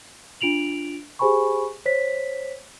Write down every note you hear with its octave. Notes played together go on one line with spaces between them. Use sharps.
D4 F4 D7 F7 F#7
G4 G#4 C5 G#5 B5 C#6
C5 C#5 B6